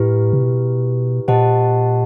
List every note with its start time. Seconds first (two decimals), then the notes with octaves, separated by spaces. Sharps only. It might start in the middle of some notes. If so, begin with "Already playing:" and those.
Already playing: A2 E4 G4 B4
0.33 C3
0.42 B2
1.28 A#2 G4 C5 D#5 F#5 A5